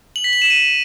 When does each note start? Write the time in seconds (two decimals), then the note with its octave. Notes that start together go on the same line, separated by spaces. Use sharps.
0.16 F#7
0.24 B6
0.33 F#7
0.42 E7
0.50 D#7